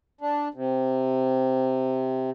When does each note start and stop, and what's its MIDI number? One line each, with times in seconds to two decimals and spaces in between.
0.21 0.48 62
0.54 2.30 48